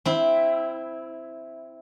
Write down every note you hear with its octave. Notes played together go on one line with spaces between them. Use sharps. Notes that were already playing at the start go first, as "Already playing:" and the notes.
C4 E4